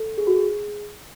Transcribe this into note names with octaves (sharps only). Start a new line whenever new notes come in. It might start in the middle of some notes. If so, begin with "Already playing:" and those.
Already playing: A4
G#4
F#4
G#4